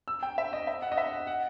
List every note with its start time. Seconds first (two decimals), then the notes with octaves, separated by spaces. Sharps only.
0.08 E6
0.23 G5
0.38 E5
0.53 D#5
0.67 E5
0.82 F#5
0.92 D#5
0.97 E5
1.12 F#5
1.27 F#5